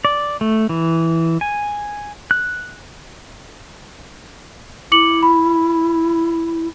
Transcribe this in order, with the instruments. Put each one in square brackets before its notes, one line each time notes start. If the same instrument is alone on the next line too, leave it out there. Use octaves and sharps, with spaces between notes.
[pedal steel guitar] D5
A3
E3
G#5
F#6
[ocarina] E4 [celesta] D6 C#7 F#7
[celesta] B5